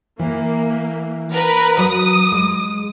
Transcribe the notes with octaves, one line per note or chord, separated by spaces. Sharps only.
E3 A#3
A#4 B4
F#3 D#6
G#3